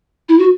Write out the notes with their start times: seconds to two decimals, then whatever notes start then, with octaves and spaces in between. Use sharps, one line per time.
0.29 E4
0.39 F#4